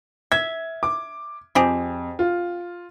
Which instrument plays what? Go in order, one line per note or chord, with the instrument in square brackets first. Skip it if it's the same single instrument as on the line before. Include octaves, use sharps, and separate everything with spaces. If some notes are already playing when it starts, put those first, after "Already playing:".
[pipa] E5 [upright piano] G#6
[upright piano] D6
[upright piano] F2 [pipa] C4 G4 G#4
[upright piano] F4